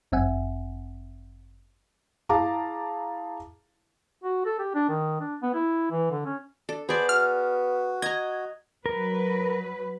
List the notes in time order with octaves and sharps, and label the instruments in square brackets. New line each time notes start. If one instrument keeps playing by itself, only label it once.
[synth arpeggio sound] G1 F#2 C4 E5 F#5 G#5
[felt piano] E4 G#4 F5 A5 A#5 D6
[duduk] F#4
A4
G4
D4
D#3
D4
B3
E4
E3
D3
C#4
[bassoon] D4 [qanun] A4
[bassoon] B3 [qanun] G#4 D5 [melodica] C5 B5
[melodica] F#4 [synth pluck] F6
[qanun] D#5 A#5 [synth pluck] G#6
[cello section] F#3 B4 [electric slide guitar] A#4